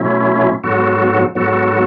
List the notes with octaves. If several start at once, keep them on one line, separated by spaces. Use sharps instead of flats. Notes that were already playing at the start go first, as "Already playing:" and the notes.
Already playing: B2 F#3 A3 C#4 E4
G#2 F#3 B3 F#4 A4
G#2 F#3 B3 F#4 A4